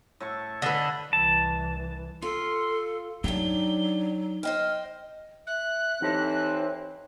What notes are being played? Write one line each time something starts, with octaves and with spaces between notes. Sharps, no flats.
A2 A5 C#6
D3 B4 D#5 E5 G#5
C2 E3 A5
F4 A4 C6
F#3 D4 D#4 G4 G7
C5 D#5 G5 F6
E5 F#6
E3 C4 D#4 G4 A4 C#5